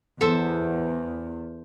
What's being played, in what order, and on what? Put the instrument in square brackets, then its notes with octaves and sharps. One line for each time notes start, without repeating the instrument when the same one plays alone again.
[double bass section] E2 [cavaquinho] A4 C5 E5